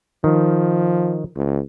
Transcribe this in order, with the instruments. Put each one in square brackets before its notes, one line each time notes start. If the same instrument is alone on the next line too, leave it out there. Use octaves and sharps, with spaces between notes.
[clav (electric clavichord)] D#3 [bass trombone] F3
[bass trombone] C#2